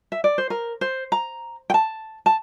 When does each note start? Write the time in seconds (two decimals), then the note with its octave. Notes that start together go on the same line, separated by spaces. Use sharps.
0.12 E5
0.24 D5
0.38 C5
0.50 A#4
0.81 C5
1.12 A#5
1.70 G5
1.74 A5
2.26 A5